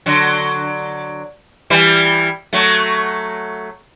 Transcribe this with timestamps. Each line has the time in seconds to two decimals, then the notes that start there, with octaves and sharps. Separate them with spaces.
0.06 D3 F#3
1.70 E3 G3
2.53 F#3 A3